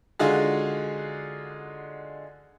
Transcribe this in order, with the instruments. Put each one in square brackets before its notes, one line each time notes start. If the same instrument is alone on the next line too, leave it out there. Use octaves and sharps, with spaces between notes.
[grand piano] D3 G#3 D#4 F4 F#4 G#4